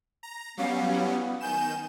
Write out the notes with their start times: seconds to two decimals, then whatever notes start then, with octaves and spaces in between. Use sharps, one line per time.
0.23 A#5
0.57 F#3 G3 B3 C#4 F5
0.92 E4
1.41 D#3 G#5 G6 E7